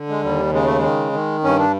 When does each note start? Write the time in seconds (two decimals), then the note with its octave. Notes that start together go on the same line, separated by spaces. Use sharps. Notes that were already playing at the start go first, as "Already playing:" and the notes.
Already playing: D3
0.09 G#3
0.22 D#2 G3
0.52 C#3 G#3
0.65 A3
0.78 G#3
0.83 D#3
1.13 D#3
1.44 G2 C#4
1.59 D4